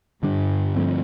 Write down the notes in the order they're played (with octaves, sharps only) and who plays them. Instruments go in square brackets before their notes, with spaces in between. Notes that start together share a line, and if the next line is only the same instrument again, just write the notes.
[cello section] G2 [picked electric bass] D3 G3 D4
[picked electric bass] D3 F3 A3 C4